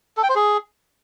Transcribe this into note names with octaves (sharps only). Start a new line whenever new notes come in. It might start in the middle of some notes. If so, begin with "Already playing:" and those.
A4
G5
C5
G#4